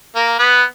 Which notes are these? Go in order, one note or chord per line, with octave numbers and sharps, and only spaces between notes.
A#3 A#4
B3 B4